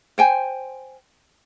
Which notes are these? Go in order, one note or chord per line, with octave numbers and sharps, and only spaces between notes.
C5 G5 G#5